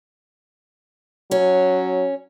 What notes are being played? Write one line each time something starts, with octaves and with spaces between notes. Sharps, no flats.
F#3 C#4